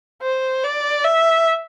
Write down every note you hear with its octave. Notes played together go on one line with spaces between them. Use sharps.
C5
D5
E5